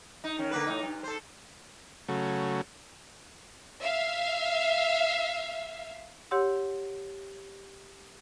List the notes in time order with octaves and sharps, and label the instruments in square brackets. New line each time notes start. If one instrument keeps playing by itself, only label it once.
[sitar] D#4
D#3 C#4
D3 A#3 B4
A2 D3 D#4
G2
A4 C5
[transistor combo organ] C#3 F#3 A3
[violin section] E5 F5
[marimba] G4 C#5 F#5 C6 E6